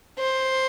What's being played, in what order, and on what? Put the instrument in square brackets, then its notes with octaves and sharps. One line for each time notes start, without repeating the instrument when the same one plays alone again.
[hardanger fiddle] C5